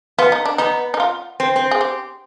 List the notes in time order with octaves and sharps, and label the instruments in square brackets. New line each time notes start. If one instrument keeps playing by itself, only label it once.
[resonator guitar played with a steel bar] B3 [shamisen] F4
[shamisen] D#4
D4
[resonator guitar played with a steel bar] B3 [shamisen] D#4
[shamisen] D#4
F4
[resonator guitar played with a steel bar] C4
C4
[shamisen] G#4
G4